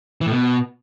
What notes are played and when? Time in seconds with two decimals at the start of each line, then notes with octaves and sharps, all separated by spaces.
0.21 E3
0.26 A2
0.32 B2